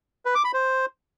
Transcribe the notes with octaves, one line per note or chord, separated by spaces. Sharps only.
B4
D6
B5
C5